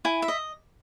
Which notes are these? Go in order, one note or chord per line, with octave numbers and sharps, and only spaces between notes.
E4 G#5
E5
D#5